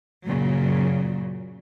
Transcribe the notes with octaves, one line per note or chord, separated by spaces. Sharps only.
F#2 A#2 C#3 F#3